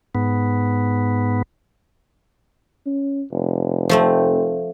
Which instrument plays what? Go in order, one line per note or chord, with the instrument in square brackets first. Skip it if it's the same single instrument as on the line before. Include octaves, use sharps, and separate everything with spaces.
[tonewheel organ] G#2 B3
[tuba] C#4
F1
[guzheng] F3 A3 C4